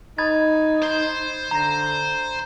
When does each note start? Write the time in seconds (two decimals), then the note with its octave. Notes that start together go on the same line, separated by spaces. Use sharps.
0.18 D#4 B5 G#6 A6
0.82 C5 C6
1.51 D3 A#5 A#6